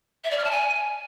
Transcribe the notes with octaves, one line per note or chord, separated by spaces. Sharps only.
E5
D5
F6
A5
G#5